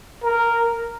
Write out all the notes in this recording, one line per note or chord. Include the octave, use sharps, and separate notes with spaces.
A#4